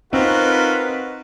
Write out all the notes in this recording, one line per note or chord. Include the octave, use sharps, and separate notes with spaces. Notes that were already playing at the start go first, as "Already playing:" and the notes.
C4 D#4 F4 F#4 A#4 B4